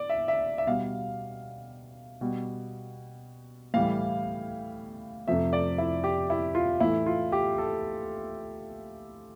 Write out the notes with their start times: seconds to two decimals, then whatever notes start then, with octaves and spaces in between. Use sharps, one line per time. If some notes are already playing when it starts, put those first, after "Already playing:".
Already playing: D5
0.10 E5
0.28 E5
0.58 E5
0.67 B2 G3 F5
2.21 B2 G3
3.74 A2 E3 G3 F5
5.27 F2 C3 F3 A3 E5
5.53 D5
5.78 E4
6.04 G4
6.30 E4
6.55 F4
6.80 A2 E3 A3 E4
7.06 F4
7.32 G4
7.58 A4